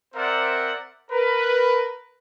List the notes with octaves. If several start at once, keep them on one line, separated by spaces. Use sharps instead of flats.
C4 A#4 C5 D5 E5 F#5
A#4 B4